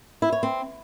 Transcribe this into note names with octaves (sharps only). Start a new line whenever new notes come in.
E4
C#5
C4